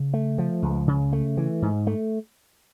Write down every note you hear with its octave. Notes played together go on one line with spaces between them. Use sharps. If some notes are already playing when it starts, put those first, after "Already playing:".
Already playing: C#3
A3
F3
C#2
C#3
A3
E3
G#2
A3